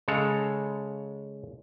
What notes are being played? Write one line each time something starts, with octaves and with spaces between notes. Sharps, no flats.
C#3 G#3 A4 C#5